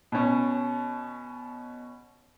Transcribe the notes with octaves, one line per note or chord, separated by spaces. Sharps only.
B2 C#4